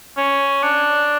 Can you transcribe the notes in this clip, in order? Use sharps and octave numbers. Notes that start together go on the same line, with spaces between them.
C#4
D4